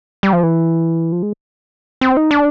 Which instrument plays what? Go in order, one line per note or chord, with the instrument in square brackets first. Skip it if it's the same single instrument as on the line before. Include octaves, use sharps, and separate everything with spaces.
[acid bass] G3
F3
E3
F3
G#3
C4
D#4
D4